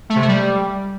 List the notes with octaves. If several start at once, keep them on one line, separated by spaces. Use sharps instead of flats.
A3
C3
A3
G3